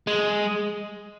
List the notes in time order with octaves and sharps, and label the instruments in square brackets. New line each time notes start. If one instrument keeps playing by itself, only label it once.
[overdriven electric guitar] G#3